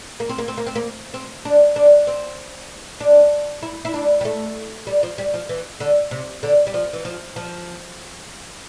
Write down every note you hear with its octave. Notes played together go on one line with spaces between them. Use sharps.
A#3
C4
A#3
C4
A#3
C4
A#3
C4
D4
D4
C4
D4
E4
E4
D4
G3
A3
G3
F3
G3
F3
E3
D3
C3
D3
G3
F3
E3
F3
F3